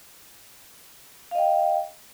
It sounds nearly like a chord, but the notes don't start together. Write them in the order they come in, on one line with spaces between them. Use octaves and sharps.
F5 D#5 G5